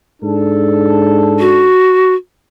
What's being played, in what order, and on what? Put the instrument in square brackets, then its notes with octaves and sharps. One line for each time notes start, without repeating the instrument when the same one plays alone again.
[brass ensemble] G#2 D4 A4
[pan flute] F#4